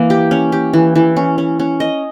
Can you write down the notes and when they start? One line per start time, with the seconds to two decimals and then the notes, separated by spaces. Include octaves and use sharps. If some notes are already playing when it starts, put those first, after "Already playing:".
Already playing: E3 A#3
0.10 G4
0.31 C#4
0.52 G4
0.73 E3
0.95 E3
1.17 C#4
1.38 C#4
1.60 C#4
1.80 D#5